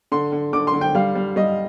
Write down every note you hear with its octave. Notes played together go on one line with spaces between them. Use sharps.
D3 C6
D3
D3 D6
C6
D3
G5
G3 F5
G3
G3 D#5